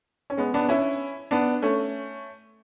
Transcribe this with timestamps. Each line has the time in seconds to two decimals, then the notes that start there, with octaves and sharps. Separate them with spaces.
0.30 C#4
0.37 G#3 B3
0.54 B3 D4
0.69 C#4 E4
1.31 B3 D4
1.62 A3 C#4